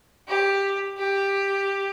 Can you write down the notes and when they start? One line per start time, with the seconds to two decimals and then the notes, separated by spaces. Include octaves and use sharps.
0.28 G4
0.98 G4